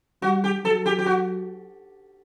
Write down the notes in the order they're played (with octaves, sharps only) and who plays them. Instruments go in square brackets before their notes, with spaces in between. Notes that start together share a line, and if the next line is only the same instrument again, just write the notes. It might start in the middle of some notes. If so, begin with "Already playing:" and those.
[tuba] G3 [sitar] F#4
[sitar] G4
[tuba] F#3 [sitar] A4
[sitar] G4
G4
F#4